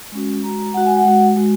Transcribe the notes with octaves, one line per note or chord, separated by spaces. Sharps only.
G#3 C#4 F#4
G#3 F#4 A#5
A#5
G#3 F#4 F#5
G#5
F#5
G#3 F#4
G#3 F#4